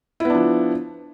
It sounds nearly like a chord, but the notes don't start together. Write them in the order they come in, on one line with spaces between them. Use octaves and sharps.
E4 B3 D4 F3